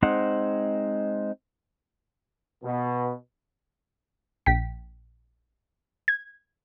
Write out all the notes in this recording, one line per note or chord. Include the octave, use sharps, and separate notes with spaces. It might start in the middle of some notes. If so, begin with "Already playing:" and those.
G#3 C4 D#4 C5 F#5
B2
A#1 G5 B6
G#6